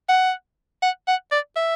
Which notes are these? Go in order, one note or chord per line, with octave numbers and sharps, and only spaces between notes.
F#5
F#5
F#5
D5
E5